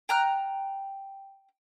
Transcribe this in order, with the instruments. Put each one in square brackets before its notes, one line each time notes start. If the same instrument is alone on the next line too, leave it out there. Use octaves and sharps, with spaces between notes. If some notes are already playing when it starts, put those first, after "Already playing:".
[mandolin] G5 A#5 F6 F#6